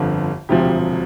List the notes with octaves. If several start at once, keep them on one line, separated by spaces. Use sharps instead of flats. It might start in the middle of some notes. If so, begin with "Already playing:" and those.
Already playing: G1 F2 D3 F3
E1 D2 C3 F3 G4